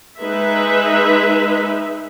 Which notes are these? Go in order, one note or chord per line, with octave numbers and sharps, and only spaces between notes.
G#3 D#4 B4 E5